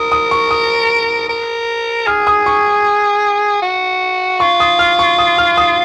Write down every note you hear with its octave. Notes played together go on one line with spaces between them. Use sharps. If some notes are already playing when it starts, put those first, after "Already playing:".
Already playing: A#4 D#6
D#6
C#6
D#6
A#4
G#4 F6
D#6
C#6
F#4
F4 C#6
D#6
F6
C#6
D#6
F6
D#6